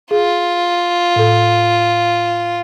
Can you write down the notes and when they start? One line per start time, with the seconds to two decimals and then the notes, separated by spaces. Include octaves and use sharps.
0.11 F4 G#4
1.16 A2 A4